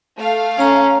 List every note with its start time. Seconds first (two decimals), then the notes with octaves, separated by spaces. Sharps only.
0.17 A3 F5
0.59 C#4 C#5 A#5